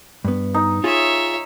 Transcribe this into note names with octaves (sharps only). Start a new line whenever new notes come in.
G2 B3
D#4
F4 G#4 C#5 E5